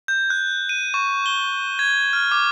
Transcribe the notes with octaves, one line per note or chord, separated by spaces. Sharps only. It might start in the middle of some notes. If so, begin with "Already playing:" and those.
G6
F#6
D#7
C#6
G7
G#6
F6
D6